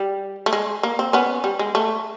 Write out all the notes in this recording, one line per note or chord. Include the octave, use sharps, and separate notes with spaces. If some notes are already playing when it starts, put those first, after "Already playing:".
Already playing: G3
A3
G#3
A#3
C4
B3 C#4
G3
G#3
A3